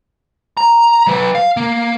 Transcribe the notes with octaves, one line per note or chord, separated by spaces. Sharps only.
A#5
F#3 B4
F5
A#3